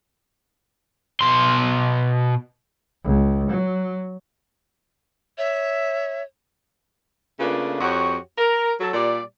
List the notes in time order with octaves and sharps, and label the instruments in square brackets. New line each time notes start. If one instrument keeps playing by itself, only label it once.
[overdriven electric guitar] B2 C6
[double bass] C#2
F#3
[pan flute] C#5 [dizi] E5
[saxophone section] C#3 A3 A#3 D4 F4 B4
F2 F#4 G4 C#5 F#5
A#4
F#3 A4
A#2 G3 D5